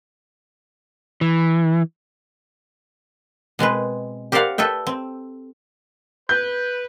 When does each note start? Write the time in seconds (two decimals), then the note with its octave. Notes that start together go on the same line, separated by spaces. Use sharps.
1.21 E3
3.59 B2 G#3 C4 B4
4.32 G4 A#4 C5 D5 F5 F#5
4.58 A4 B4 E5 G5
4.87 C4
6.29 B4 G6